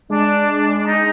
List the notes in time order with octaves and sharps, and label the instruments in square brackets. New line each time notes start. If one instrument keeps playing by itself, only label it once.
[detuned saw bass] G#3 [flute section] D4
[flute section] D4
D#4